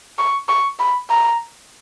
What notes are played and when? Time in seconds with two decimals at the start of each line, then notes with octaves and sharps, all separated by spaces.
0.18 C#6
0.49 C#6
0.79 B5
1.10 A#5